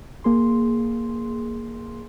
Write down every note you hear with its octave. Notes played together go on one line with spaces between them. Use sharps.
G#1 A#3 G#4 C6